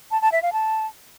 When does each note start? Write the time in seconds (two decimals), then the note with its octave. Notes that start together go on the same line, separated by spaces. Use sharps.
0.11 A5
0.22 A5
0.32 E5
0.42 F5
0.53 A5